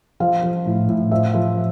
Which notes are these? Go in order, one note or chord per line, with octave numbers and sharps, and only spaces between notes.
F3 F5
F3
A2
A2
F3 E5
F3